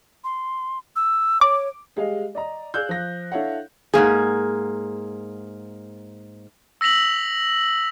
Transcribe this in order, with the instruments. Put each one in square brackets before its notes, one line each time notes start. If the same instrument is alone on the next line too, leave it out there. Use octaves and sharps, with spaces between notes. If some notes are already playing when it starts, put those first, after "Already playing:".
[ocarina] C6
E6
[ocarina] C#5 [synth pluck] D6
[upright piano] G3 G#3 G4 G#4 D#5 F5
D5 D#5 A#5
G#4 D5 F5 E6 F#6 G6
F3 A#6
D4 E4 A4 C#5 F5 F#5
[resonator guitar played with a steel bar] G#2 D#3 A#3 G#4
[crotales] E6 A#6 B6 F7 F#7